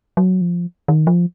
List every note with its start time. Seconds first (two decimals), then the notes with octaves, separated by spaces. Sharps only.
0.17 F#3
0.41 F3
0.88 D#3
1.07 F3